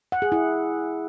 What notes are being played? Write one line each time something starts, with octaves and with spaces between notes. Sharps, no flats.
F#5
G#4
E4